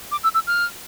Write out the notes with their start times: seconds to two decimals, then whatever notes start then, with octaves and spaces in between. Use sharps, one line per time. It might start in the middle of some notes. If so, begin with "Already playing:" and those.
0.12 D6
0.24 E6
0.35 E6
0.47 F6